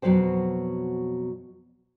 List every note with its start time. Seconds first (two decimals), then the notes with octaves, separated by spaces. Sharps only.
0.02 F2 B2 F#3 B4 C5 G5